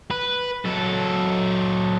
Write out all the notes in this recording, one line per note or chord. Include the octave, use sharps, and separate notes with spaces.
B4
F#3 A4